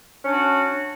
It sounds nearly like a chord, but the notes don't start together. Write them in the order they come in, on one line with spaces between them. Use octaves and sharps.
C#4 D4 F#4